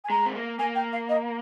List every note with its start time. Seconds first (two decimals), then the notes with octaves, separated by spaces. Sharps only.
0.04 G#5
0.10 G#3 A#5
0.26 C4
0.35 A#3
0.59 A#3 G#5
0.75 G5
0.93 F5
1.09 D#5